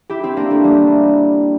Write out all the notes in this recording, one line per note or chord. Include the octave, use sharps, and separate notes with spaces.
E4 G4
C4 E4
A#3 D4
A3
G3 A#3